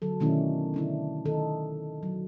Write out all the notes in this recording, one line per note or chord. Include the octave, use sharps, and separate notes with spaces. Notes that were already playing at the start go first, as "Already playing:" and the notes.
D3 F#3 A4
B2 D#3 A3 C#4 D4 E4
D3 D4 E4
D#3 D#4 A4
F#3